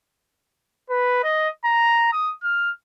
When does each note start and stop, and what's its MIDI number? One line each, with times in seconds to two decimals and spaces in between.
0.90 1.23 71
1.24 1.48 75
1.65 2.10 82
2.13 2.33 87
2.44 2.71 89